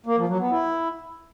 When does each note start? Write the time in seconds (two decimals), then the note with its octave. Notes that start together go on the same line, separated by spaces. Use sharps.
0.06 A#3
0.17 F3
0.28 F#3
0.40 B3
0.51 E4